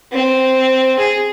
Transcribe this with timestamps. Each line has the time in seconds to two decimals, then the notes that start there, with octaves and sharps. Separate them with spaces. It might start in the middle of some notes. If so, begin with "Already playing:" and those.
0.12 C4
0.99 G#4